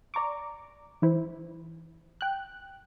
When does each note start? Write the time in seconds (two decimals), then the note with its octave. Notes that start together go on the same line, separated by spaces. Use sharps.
0.14 D5 A#5 C#6 D6
1.02 E3 E4 C5
2.21 G5 F#6